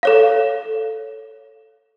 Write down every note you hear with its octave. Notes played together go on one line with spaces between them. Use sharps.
A4 C#5 F5